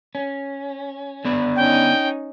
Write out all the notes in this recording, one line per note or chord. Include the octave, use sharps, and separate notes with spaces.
C#4
D3 B3 D5
C#4 D#4 G5